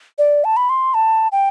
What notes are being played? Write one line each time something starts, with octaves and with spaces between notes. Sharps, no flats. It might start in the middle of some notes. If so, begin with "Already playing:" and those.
D5
A5
B5
C6
A5
G5